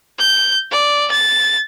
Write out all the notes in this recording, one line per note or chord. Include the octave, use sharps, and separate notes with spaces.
G6
D5
A6